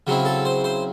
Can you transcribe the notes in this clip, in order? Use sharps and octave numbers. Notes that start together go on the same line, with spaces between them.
C#3 F#3 C4 E4
A4
C5
C5